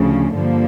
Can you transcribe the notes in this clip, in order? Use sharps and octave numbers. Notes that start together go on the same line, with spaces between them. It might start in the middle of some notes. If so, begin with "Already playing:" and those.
Already playing: D2 C#3 F3
G2 D3 F3 A#3